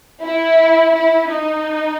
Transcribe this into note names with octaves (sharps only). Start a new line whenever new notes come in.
E4
E4
D#4